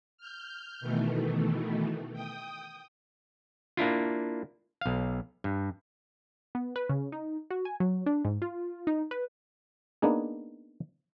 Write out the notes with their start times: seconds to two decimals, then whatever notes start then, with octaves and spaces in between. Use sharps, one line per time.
0.18 F6 G6
0.80 B2 D#3 E3 A3
2.13 G5 D#6
3.77 A#3 D4 E4 F4
4.81 B1 F5
5.44 G2
6.55 B3
6.76 B4
6.89 C#3
7.12 D#4
7.50 F#4
7.65 G#5
7.80 F#3
8.06 D4
8.25 G#2
8.42 F4
8.87 D#4
9.11 B4
10.02 A#3 B3 D4 D#4 G#4